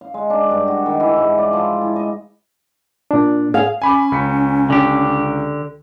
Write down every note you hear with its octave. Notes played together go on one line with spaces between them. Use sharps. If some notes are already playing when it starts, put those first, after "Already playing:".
F5
G#3
D4
G2
F#4
D#3
E3
G#2
D5
F3
E4
D#5
A#2 D4
G#4 F5
C#4 G#5 B5 D6
C#2 B6 C#7
D3 G4